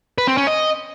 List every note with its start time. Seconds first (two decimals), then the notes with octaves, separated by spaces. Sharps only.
0.18 B4
0.28 C4
0.37 C#4
0.47 D#5